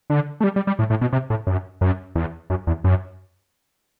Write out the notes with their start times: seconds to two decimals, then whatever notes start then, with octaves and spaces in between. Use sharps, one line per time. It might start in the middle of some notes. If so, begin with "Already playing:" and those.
0.10 D3
0.40 A3
0.44 G3
0.56 G3
0.67 G3
0.79 A2
0.90 A2
1.01 B2
1.12 C3
1.30 A2
1.47 F#2
1.81 F#2
2.15 E2
2.50 F#2
2.67 E2
2.84 F#2